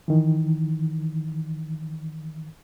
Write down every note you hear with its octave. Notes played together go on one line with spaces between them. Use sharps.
D#3 E3